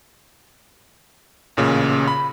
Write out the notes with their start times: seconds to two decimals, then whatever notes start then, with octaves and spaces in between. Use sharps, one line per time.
1.57 A1 A#2 C#3
2.08 B5